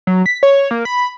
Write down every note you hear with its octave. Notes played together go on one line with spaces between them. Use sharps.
F#3
B6
C#5
A#3
B5